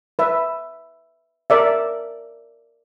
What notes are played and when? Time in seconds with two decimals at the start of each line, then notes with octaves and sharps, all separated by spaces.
0.19 B4 E5
1.50 A#4 D5 E5